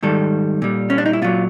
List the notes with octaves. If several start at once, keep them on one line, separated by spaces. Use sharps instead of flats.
G#2 D#3 G3 A4
A#2 G3
C#4
D4
D#4
E4
A#2 F#3 F4